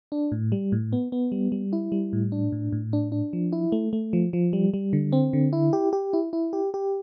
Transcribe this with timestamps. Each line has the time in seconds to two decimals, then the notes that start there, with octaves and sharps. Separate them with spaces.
0.12 D4
0.32 A2
0.52 G3
0.72 A2
0.93 B3
1.12 B3
1.32 G3
1.52 G3
1.73 E4
1.92 G3
2.13 A2
2.32 D4
2.52 A2
2.72 A2
2.93 D4
3.12 D4
3.33 F3
3.52 E4
3.72 A3
3.93 A3
4.13 F3
4.33 F3
4.53 G3
4.74 G3
4.93 D3
5.12 C4
5.33 D3
5.53 E4
5.73 G4
5.93 G4
6.13 E4
6.33 E4
6.53 G4
6.74 G4